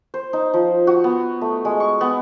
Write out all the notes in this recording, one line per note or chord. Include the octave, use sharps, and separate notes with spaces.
C5
D#4
F3
F#4
B3
A3
G#3
C#6
B3